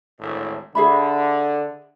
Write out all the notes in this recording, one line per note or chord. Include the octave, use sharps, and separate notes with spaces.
G#1 D2 A2
D3 G#4 E5 B5